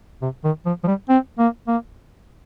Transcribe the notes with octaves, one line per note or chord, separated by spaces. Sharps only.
C3
D#3
F3
F3
G3
C4
A#3
A#3